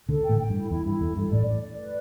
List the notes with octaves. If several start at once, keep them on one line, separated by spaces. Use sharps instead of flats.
D2 D3 A4
G5
A1 A2
G5
G2
E4
E2 E4
G2 E4
E2 A4
G2 A4
A1 A2 D5
D5
D5
B4